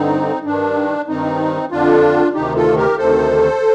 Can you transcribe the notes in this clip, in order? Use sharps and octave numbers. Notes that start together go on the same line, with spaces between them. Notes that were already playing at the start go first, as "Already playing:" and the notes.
Already playing: G2 D3 C4 D#4
G2 D#3 D4
G2 D#3 C4 D#4
F2 D3 D4 F4
D2 C3 D#3 D#4 G4
F4 A4
G4 A#4
D2 C3 D#3 A4 C5